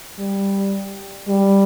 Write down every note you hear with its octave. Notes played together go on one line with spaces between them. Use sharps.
G3
G3